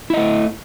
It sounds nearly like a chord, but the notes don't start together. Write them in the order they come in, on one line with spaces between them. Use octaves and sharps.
E4 D#5 A3